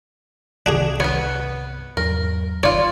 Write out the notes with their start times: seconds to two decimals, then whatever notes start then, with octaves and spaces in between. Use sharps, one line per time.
0.66 C2 G2 C3 D4 F#4 G#4
1.00 B3 B4 C#5
1.97 E2 G#2 F#3 A#4
2.63 G1 F4 C#5 D5